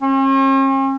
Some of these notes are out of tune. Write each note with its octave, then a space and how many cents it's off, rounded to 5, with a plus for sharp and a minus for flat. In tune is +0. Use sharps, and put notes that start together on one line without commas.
C#4 -45